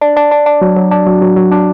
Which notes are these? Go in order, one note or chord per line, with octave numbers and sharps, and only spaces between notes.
D4
D4
D4
D4
F#3
F#3
D4
F#3
F#3
F#3
D4